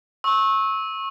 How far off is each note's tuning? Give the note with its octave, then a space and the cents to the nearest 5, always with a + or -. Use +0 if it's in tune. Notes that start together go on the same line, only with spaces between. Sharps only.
C#6 -25 E6 -25